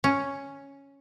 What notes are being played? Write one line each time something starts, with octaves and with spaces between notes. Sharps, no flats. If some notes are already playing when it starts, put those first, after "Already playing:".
C#4